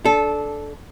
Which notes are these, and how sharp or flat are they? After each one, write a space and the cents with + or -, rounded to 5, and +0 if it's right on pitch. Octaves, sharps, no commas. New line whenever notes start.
D4 +0 A4 -15